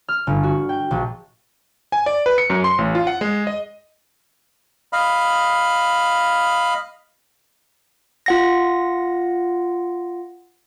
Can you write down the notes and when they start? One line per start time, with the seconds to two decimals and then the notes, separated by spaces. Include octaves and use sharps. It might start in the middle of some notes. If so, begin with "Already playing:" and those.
0.09 F6
0.27 G1
0.43 F#4
0.69 G5
0.91 A#1
1.92 G#5
2.06 D5
2.26 B4
2.38 C#7
2.50 F#2
2.64 C6
2.78 A1
2.95 F4
3.07 F#5
3.21 G#3
3.47 D#5
4.93 D#5 F5 B5
8.26 F4 F#5 A#6